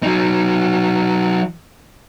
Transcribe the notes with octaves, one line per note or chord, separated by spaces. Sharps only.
F#3 D#4